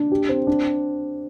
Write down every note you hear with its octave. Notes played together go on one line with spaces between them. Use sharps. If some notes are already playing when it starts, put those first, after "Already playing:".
Already playing: D4
G4
C4
D4